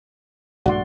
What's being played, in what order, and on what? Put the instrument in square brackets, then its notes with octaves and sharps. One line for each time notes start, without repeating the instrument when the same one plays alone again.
[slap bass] A#1 G2 A3 [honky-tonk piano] F#4 [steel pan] D5 C6